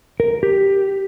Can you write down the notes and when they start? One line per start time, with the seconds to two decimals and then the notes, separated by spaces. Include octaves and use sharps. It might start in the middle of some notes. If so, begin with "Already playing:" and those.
0.20 A#4
0.43 G4